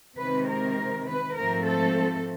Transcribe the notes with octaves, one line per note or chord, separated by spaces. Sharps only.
C3 D#3 G#3 C4 B4
A#4
B4
G#2 F3 A3 C4 A#4
A4